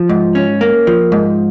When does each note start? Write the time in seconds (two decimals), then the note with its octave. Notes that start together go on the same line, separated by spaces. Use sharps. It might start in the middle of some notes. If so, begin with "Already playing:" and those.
Already playing: F3
0.09 G#2
0.35 C#4
0.61 A#3
0.87 F3
1.12 G#2